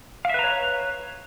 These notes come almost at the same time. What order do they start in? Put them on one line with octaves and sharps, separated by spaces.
F5 E5 B4 A#5 C#5